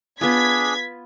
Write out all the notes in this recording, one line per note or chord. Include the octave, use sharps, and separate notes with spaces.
B3 D4 F4 G#4 G#6 B6